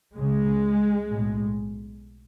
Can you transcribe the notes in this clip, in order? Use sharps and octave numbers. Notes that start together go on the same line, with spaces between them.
C#2 C#3 G#3
B1 A2